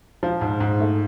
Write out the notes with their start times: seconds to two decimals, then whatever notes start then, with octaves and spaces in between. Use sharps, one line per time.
0.23 F3
0.41 G#2
0.60 G#2
0.80 A3